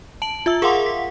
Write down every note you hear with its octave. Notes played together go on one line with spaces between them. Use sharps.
A5 D7 F#7
F4 E5 E6
G#4 A#4 F5 F#5 C6 D6
B6